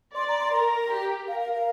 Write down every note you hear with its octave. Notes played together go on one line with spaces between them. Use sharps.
D5 C6
A#5
C6
A#4 A#5
G4
A#4 F5
F5
F5